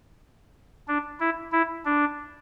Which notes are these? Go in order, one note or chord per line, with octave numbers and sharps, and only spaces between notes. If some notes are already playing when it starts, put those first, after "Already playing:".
D4
E4
E4
D4